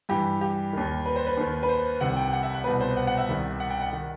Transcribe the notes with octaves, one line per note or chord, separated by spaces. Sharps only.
G2 E3 G4
G4
D#2 D#3
B4
C5
B4
D#2 D#3
B4
C5
C2 C3 D#3 F#5
G5
F#5
E5
F#5
C2 B2 B4
C5
F#5
F#5
E5
C2 C3 D#3
F#5
G5
F#5
D#3